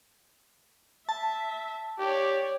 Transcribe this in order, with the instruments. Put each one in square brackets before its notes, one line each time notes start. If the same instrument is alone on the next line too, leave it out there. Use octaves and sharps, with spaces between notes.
[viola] E5 [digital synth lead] A5
[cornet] G4 [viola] C#5 D5